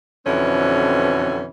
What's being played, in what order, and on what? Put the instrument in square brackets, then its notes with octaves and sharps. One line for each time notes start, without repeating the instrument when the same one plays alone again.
[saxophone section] F2 B2 D3 E3 C4 C#4